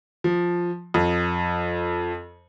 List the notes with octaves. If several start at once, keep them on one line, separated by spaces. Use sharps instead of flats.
F3
F2